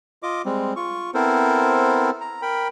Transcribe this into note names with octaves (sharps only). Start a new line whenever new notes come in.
F4 D#5 D6
G3 G#3 C4
F4 C#6
B3 C4 E4 A4 A#4 C5
A#5
A#4 G5 B5